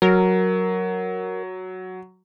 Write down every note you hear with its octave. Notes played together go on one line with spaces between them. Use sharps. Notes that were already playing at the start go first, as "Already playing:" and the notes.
F#3 A#4